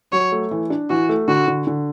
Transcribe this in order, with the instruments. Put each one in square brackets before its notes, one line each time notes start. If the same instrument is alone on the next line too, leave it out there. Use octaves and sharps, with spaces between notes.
[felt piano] F#3 [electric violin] C#5
[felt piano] A3
E3
D4
[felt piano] E3 [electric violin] F#4
[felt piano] A3
[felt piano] D3 [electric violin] F#4
[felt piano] D3
D3